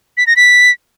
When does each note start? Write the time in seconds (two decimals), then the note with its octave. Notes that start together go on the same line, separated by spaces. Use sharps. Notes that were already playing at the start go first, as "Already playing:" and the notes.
0.17 B6
0.27 A#6
0.36 B6